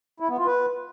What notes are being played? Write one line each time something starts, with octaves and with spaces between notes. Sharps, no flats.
E4
B3
F4
B4